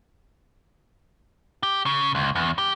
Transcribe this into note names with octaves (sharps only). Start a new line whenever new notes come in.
G4
C#3
C#2
E2
G4